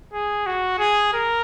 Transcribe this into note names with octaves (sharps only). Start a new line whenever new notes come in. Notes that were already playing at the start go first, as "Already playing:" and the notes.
G#4
F#4
G#4
A#4